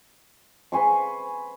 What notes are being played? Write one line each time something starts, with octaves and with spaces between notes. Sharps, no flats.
B4 G#5 C6 C#6